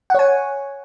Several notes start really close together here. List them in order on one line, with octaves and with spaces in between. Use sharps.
F#5 C#5 G#5